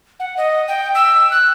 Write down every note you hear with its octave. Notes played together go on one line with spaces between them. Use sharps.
F#5
D#5
G5
E6
F#6